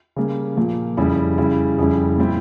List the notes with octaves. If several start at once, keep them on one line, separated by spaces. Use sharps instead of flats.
C#3 G3 A#3
A#2 F3 A#3
F2 C#3 G3 C#4 E4
C#3 G3 C#4 E4
F2 C#3 G3 C#4 E4
A#2 G3 C4 E4